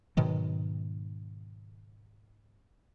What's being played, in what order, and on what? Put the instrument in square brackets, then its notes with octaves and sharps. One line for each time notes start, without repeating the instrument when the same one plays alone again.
[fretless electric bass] G#2 B2 D#3 F#3